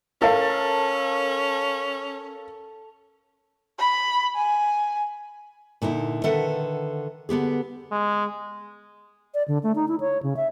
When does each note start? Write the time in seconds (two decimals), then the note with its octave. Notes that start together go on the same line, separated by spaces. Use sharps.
0.22 C#4 A4 A#4 F5
3.79 B5
4.35 G#5
5.82 A#2 D3 D#4 E4
6.24 D3 D#3 A4 B4 E5 F#5
7.29 D3 B3 G4 G#4
7.91 G#3
9.34 D5
9.48 D3
9.63 A3
9.76 D#4
9.88 E4
10.00 C#5
10.23 C#3
10.37 E5